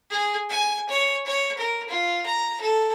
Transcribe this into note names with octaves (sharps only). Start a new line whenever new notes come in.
G#4
G#5
C#5
C#5
A#4
F4
A#5
A4